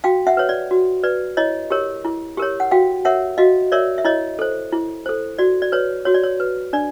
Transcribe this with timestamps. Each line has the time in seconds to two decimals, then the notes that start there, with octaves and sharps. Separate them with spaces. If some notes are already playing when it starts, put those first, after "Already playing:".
0.04 F#4 F5 G5
0.27 E5 F#5
0.37 B4 C#5
0.49 D5
0.71 F#4
1.04 B4 D5
1.37 E4 C#5 D#5
1.70 G4 A#4 C#5
2.05 E4
2.37 G4 A#4 C#5
2.60 F#5
2.71 F#4 F5 G5
3.05 A#4 C#5 E5 F#5
3.38 F#4 D#5 F5
3.72 A#4 C#5 D5 E5
3.98 E5
4.05 E4 C#5 D#5
4.39 A4 C5
4.73 E4
5.06 A4 C5
5.38 F#4 D5
5.62 D5
5.72 B4 C#5
6.05 F#4 C#5
6.14 D5
6.23 C#5
6.40 B4
6.73 D4 D5